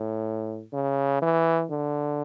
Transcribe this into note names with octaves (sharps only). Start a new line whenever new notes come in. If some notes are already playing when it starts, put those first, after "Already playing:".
Already playing: A2
C#3
E3
D3